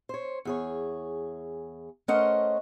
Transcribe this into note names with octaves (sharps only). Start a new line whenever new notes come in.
C5 C#5
E2 G#4 C#5
A3 C#4 A#4 C5 D#5 F#5